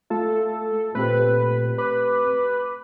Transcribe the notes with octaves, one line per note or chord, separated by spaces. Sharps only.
A3 F4 A4
A#2 A3 C4 G4 B4
B4 D6